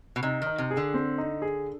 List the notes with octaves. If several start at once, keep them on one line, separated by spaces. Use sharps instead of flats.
B2
C3 D#4
D#3 D#4
C3
G#4
D3
C4
D#4
G#4